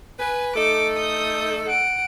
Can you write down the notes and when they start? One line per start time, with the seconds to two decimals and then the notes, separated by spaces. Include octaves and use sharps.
0.19 B4 G#5
0.56 A3 D#4 A4 D6
0.97 D#6 G6
1.67 F#5 D7